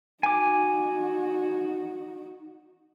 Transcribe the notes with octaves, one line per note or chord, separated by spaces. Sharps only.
D#4 F#4 G#5 D6